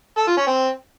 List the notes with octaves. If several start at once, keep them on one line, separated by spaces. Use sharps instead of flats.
A4
F4
C#4
C4